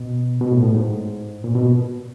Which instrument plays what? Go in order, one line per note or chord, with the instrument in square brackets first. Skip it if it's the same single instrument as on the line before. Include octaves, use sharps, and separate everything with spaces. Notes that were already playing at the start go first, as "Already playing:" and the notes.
Already playing: [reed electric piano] B2
B2
A2
A2
G#2
A#2
B2